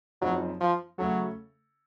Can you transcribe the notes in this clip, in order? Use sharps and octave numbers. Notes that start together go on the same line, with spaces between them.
F#1 F#2 F3 F#3 C4 D#4
F3
C#3 F#3 A3 C#4 A4